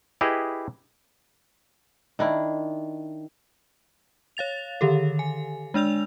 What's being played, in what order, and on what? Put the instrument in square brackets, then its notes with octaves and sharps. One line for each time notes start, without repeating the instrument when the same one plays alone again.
[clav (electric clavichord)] E4 G4 G#4 B4 D#5
[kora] D#3 D4 E4
[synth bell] C#5 F5 A6 F7
D3 D#3 G4 A4
G#5
G#3 D4 D5 E6 F7